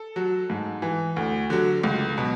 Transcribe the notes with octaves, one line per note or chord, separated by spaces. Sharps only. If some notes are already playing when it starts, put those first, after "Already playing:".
Already playing: A4
F#3
G#2
E3
D2
D3 F#3
C#2
B2 F#3